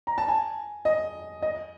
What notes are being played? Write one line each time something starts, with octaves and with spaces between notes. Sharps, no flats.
A#5
A5
G#5
D#5
D#5